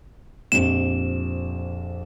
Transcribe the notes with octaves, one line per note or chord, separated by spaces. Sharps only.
A#1 F2 G4 E7